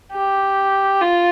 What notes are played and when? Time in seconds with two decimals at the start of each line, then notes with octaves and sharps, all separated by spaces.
0.13 G4
1.02 F4